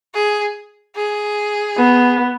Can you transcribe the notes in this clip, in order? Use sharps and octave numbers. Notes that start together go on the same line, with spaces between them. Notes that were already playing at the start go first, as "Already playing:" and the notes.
G#4
G#4
B3